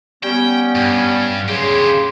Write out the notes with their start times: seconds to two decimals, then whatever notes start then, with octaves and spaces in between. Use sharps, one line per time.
0.23 G3 B3 C#4 G5
0.75 G2
1.48 D2 C#3 G4 G#4 C6